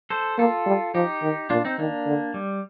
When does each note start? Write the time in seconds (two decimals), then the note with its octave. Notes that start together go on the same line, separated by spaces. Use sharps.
0.10 A4 C5
0.38 A#3 F4 A4
0.66 G3
0.94 F3 D#4 G4
1.22 D#3
1.50 A#2 D4 F4
1.65 C4 D#4
1.79 D#3 A#3 D4
2.07 D3
2.34 G3